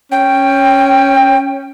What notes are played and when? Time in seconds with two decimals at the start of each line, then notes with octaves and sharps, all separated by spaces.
0.12 C#4 G5